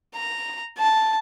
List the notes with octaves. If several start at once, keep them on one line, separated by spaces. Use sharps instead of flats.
A#5
A5